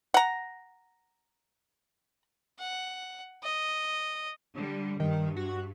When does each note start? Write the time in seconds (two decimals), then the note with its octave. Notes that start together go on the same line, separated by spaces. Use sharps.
0.14 F#5 A#5
2.59 F#5
3.43 D#5
4.55 D3 G3
5.00 G2 D#3
5.37 F#4